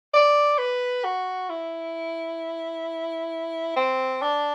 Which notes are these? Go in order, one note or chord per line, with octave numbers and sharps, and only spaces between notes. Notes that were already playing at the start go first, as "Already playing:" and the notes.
D5
B4
F#4
E4
C4
D4